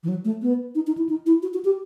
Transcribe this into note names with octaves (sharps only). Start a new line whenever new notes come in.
E3
F#3
A3
B3
D#4
D#4
E4
D#4
E4
F#4
F#4
G4